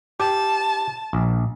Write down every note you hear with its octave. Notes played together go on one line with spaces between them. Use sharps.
G4 A5
A#1